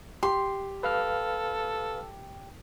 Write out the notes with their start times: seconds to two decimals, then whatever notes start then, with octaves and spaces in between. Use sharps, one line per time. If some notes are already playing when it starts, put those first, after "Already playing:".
0.23 G4 C6
0.83 A4 B4 F5 F6